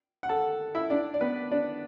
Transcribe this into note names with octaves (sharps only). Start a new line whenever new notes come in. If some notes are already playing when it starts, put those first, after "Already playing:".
F#5
A4 A5
E4 E5
D4 D5
D5
B3 B4
D4 D5